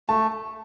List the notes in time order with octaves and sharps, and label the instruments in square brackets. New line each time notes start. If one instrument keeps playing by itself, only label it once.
[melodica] A3 [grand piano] A5